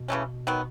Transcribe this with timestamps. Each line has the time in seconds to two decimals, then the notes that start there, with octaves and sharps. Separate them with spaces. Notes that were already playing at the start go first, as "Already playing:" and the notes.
Already playing: B2
0.08 C#3 E3 A3 C#4
0.47 D#3 F#3 B3